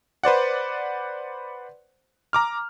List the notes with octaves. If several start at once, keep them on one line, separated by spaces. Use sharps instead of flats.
B4 C5 D5 F#5
A#5 D6 F6